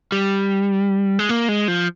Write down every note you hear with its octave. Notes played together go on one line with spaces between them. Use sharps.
G3
G#3
A#3
G#3
F3